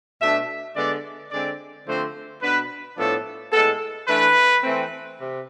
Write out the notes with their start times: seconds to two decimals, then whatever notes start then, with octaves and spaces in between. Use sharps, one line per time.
0.20 B2 A3 D4 E5
0.76 D3 G#3 B3 D5
1.31 D3 G#3 C4 D5
1.86 D3 F3 A3 C4 C5
2.42 B2 B3 D4 B4
2.97 A2 F3 B3 D4 A4
3.52 A2 G#3 B3 A4
4.08 E3 A3 D4 B4
4.63 E3 A3 C4
5.19 C3